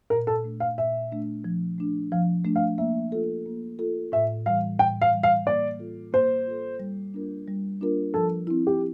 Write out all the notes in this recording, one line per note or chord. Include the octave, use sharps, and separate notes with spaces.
A#2 A#4
A4
A3 D4
F5
A#2 E5
A3 D4
F3
A3 D4
F3 F5
A3 D4
F5
A#3 E5
F4 A4
A#3
F4 A4
A2 E5
E3 G3 F5
A2 G5
F5
E3 G3
F5
A#3 D5
F4 A4
A#3 C5
F4 A4
G3
A#3 D4 F4 A#4
G3
A#3 D4 F4 A#4
F3 A4
C4 E4
G4